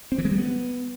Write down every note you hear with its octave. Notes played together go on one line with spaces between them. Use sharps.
C4
E3
G#3
G3
B3